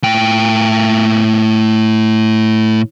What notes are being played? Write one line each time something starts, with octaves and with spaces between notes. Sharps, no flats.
A2 G5